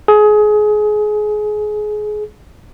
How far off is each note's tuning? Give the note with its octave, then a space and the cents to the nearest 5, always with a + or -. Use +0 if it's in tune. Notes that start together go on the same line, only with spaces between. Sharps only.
G#4 +25